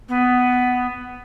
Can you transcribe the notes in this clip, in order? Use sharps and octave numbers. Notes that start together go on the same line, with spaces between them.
B3